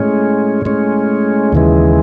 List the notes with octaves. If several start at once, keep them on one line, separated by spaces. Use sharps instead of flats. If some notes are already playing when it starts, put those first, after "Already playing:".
Already playing: A2 G#3 C#4
A2 G#3 C#4
D#2 C#3 E3 G#3